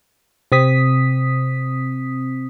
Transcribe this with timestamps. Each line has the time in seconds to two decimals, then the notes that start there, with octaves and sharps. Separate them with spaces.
0.52 C3 C4 D#6 B6